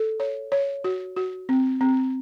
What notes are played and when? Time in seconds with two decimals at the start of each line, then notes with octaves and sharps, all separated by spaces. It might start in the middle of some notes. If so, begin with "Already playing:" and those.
Already playing: A4
0.20 C#5
0.52 C#5
0.84 F#4
1.16 F#4
1.49 C4
1.81 C4